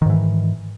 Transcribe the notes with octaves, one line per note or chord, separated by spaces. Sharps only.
G#2 D#3 E3